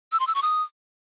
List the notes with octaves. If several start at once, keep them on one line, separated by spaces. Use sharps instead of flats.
E6
C6
E6
C#6
D#6